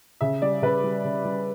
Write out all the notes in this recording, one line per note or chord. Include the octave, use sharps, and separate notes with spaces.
C#3 E5
G3 D5
C#3 B4
G3
C#3
G3